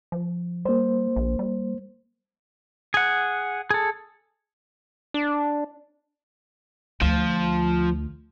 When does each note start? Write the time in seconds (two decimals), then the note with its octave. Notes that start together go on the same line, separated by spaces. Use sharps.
0.12 F3
0.65 G3 A#3 C5
1.16 A#1
1.39 G3
2.94 G#4 F#5
3.70 G#4 A4
5.14 D4
7.01 D2 F3